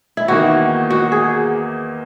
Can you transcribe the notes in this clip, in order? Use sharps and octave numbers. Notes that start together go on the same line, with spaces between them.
E4
E2 D#3 A#3 D#4 F#4
F#4
G#4